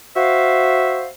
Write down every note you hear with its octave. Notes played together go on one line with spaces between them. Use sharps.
F#4 C5 E5 F5